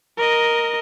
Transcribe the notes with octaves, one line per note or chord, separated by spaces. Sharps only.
A#4 D#5